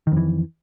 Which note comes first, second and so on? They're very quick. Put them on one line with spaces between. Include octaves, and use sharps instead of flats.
D#3 F2 E3